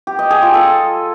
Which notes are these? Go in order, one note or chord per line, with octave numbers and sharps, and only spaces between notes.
G4
D#5
G#4
F4
A4